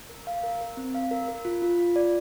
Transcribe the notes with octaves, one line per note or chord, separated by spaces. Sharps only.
A#4
F5
A#4
A#4
C4
F5
A#4
A#4
F4
F4
F4
D5